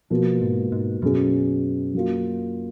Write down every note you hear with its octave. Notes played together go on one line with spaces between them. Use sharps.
B2 F3 A#3 F4
G#2
G#2
F#2 B2 F#3 C#4 G#4
F#3 A#3 F4